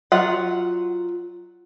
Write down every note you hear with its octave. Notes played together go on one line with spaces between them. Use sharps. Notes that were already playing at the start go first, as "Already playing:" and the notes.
F#3 F4 F#5